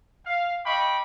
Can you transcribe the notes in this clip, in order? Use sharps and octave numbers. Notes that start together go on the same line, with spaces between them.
F5
D#5 F5 G5 B5 C#6 D6